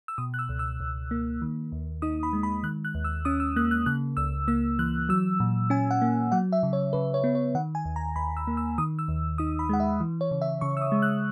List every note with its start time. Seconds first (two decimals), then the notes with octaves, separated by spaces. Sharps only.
0.08 E6
0.18 B2 D#6
0.34 F#6
0.39 E6
0.49 C#2
0.59 E6
0.80 C#2
1.11 A#3
1.42 D#3
1.72 D#2
2.02 D#4 D#6
2.23 B5
2.33 G#3
2.43 B5
2.63 D#3 F#6
2.85 F#6
2.95 D#2
3.04 E6
3.25 C#4 D#6
3.40 E6
3.56 A#3 F#6
3.71 F#6
3.86 C#3 F#6
4.17 C#2 E6
4.48 A#3 E6
4.79 E3 F#6
5.09 F#3 E6
5.40 A#2
5.70 C#4 G#5
5.91 F#5
6.01 A#3
6.32 F#3 F#5
6.52 E5
6.63 C#3
6.73 C#5
6.93 C#3 B4
7.14 C#5
7.24 B3
7.35 C#5
7.55 D#3 F#5
7.75 G#5
7.85 D#2
7.96 A#5
8.16 D#2 B5
8.37 E6
8.47 A#3
8.57 E6
8.78 D#3 D#6
8.99 E6
9.08 D#2
9.38 D#4 D#6
9.59 B5
9.69 G#3 F#5
9.80 E5
10.00 E3
10.21 C#5
10.31 C#3
10.42 E5
10.61 C#3 C#6
10.77 E6
10.82 D#6
10.92 G#3
11.02 F#6